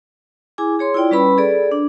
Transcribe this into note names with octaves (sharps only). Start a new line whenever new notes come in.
E4 G#4 G#5 D6
G#4 C#5 C6
E4 F4 D5 G5
G3 C#4 B4 B5 E6
G#4 A4 D5
D4